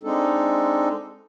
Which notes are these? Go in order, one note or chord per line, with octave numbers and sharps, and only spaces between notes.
G#3 C4 D4 D#4 A4